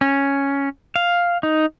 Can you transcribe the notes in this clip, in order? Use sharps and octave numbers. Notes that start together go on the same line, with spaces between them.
C#4
F5
D#4